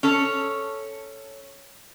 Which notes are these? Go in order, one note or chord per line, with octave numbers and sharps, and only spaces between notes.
C#4 A4 C#5